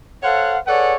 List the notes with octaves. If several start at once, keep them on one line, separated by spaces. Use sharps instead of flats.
A4 C5 C#5 F5 F#5
G#4 A4 B4 C#5 D5 F#5